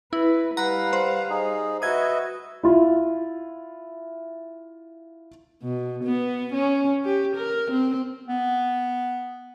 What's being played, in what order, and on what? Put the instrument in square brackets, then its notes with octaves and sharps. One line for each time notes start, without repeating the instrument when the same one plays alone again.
[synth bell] E4 [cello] B4
[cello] G3 F5 [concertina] B4 F#5 [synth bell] A#5 B5
[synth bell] C5
[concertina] D#4 G#4
[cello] F#4 [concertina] B4 D#5 E5 [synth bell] D#6 G#6
[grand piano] E4 F4 E5
[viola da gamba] B2
B3
C#4
G4
A#4
C4
[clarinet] B3